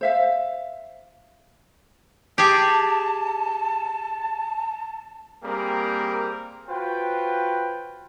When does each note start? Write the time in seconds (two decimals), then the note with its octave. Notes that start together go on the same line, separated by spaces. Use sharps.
0.01 C5 E5 F5
2.38 G4 G#4 A5
5.44 G3 A#3 C4 G#4 A#4 G5
6.68 F4 F#4 B4 C5 G5